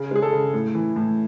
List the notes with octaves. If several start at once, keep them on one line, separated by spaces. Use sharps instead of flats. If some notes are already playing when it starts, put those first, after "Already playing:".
Already playing: C#3
G#3 G#4
A4
C#3
A2
E3
A2